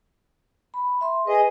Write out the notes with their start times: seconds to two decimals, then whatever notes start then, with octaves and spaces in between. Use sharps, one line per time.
0.74 B5
1.01 E5 C6
1.27 G#4 B4 D#5